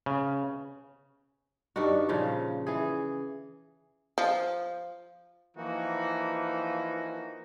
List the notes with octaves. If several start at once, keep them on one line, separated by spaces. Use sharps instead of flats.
C#3
G2 D#3 D4 F#4
A#2 C#3 F3
E3 G#4
F3
E3 F3 A#3 D#4 F#4